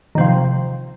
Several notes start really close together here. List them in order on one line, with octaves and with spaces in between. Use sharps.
D#3 C3 F3